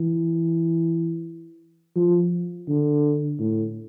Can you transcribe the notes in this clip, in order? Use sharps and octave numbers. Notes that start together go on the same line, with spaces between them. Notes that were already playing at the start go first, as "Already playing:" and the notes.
Already playing: E3
F3
D3
A2